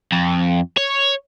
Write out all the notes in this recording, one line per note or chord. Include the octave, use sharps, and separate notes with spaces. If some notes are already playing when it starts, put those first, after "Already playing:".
F2
C#5